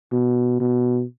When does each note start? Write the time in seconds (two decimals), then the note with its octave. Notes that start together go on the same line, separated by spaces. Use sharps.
0.12 B2
0.60 B2